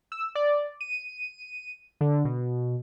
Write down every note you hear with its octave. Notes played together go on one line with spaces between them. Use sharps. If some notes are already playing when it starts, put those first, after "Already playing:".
E6
D5
D#7
D3
B2